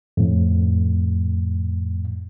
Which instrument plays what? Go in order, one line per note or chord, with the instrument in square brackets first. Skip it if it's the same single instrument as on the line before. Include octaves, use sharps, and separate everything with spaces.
[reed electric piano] F2 A2